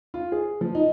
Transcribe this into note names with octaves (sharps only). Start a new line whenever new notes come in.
F4
G#4
F3
D#4